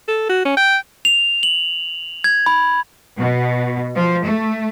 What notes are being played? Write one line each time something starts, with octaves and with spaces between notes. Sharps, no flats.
A4
F#4
C#4
G5
F7
F#7
G#6
B5
B2
F3
A3